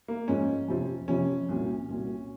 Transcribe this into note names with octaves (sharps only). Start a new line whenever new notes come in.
A#3
G#2 F3 C#4
F2 C3 F3
F2 C3 F3 C#4
C2 A#2 F#3
C2 A#2 F#3